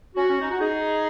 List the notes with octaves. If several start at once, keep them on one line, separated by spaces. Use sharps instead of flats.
C#4 F#4
C#4
D#4
F#4
D#4 G#4